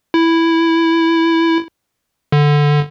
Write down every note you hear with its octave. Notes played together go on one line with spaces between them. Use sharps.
E4
D3